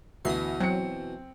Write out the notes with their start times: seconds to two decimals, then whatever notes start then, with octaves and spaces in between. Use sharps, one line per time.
0.25 D2 B2 E3 D#6 C7
0.60 F#3 C4 C#7